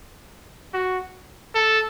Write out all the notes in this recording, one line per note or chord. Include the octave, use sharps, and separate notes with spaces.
F#4
A4